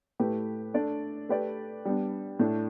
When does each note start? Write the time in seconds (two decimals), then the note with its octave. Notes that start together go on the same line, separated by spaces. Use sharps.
0.20 A2 A3 G4 B4
0.74 A3 D4 A4 D5
1.29 A3 G4 B4 D5
1.85 G3 B3 D4
2.39 A2 A3 D4